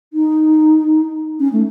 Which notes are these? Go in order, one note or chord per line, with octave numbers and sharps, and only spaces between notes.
D#4
C#4
A3